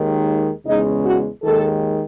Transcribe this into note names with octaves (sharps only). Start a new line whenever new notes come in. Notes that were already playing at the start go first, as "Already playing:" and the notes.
Already playing: D#2 D#3 G#3
E2 C#3 G#3 D#4
F#4
D#2 D#3 G#3 A4